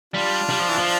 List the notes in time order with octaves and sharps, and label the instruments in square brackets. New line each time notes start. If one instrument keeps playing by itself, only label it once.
[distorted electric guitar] G3 [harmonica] D4 F4
[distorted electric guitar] G3
F3
E3
F3